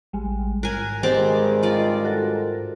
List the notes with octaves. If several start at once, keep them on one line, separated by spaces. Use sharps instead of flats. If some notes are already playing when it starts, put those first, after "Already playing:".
A1 G3 G#3
G#2 A#4 G#5 F#6
G2 D#3 G#3 C4 G4 D5
F4 D5
F#4 A4 A#4